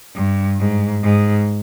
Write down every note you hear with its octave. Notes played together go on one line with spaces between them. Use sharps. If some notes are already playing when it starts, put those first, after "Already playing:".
G2
G#2
G#2